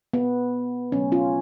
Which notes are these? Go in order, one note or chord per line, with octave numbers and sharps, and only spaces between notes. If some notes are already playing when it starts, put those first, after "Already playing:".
B3
B2 F#3 A3 C#4
C#4 F4